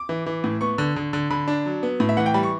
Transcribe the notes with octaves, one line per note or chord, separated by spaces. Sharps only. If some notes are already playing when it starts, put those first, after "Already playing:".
Already playing: D6
E3
E3
A2
B3 C#6
D3
D3
D3
D3 B5
D4
F#3
B3
A2
E5
E3 F#5
G5
G3 B5
C#6